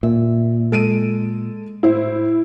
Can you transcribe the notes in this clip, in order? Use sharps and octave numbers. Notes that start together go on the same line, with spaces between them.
A#2 E5
G#3 A4 D7 D#7
A2 E4 C5